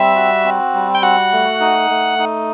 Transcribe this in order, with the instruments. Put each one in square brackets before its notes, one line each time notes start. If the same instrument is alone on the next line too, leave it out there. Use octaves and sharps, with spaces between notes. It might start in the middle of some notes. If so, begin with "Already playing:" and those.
Already playing: [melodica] G3 C4 [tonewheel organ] E5
[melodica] F#4
C4
G3
[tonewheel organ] G5
[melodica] F#4 [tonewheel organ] F#5
[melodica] A3
D#4
A3
D#4